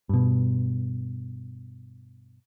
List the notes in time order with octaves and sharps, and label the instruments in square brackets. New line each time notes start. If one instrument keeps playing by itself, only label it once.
[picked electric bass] G2 B2